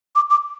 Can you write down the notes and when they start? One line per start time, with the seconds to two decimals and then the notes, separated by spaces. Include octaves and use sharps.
0.16 D6
0.30 D6